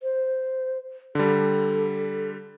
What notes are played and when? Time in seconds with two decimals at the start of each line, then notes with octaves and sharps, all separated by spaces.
0.03 C5
1.15 D3 G3 A4